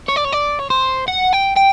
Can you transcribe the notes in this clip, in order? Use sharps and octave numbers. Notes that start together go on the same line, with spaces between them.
C#5
D5
C#5
D5
C#5
C5
F#5
G5
G5